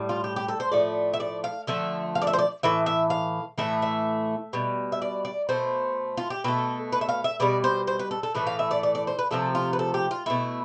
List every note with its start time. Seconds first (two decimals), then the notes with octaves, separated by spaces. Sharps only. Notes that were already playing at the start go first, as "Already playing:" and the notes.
Already playing: A2 G3
0.09 F4
0.24 G4
0.36 G4
0.48 A4
0.60 C5
0.72 A2 F3 A3 D5
1.13 E5
1.20 D5
1.44 F5
1.67 D3 F3 A3 E5
2.15 F5
2.22 D5
2.27 E5
2.33 C5
2.39 D5
2.63 A2 E3 E5
2.86 E5
3.10 F5
3.58 A2 E3 A3 E5
3.82 E5
4.53 B2 G3
4.92 E5
5.02 D5
5.25 D5
5.49 B2 A3 C5
6.17 F4
6.30 G4
6.44 B2 A3 A4
6.92 B4
7.01 E5
7.09 F5
7.24 E5
7.40 B2 G3 D5
7.64 C5
7.87 C5
7.99 B4
8.11 A4
8.23 A4
8.35 A2 E3 A3 B4
8.47 F5
8.59 E5
8.71 D5
8.83 D5
8.95 D5
9.07 C5
9.19 B4
9.31 C3 F3 A3 A4
9.55 F4
9.73 B4
9.79 A4
9.94 G4
10.11 F4
10.26 B2 A3 E4